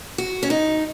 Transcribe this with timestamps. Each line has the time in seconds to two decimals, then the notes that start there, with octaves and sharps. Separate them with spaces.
0.18 F#4
0.43 C#4
0.50 D#4